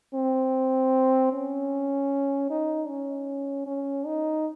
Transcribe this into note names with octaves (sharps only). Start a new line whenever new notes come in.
C4
C#4
D#4
C#4
C#4
D#4